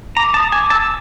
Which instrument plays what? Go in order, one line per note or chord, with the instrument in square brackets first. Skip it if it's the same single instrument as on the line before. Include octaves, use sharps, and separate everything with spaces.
[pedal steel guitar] A#5 [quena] D6
[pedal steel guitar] A5 [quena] D#6
[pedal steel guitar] G#5 [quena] D6
[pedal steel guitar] A5 [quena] E6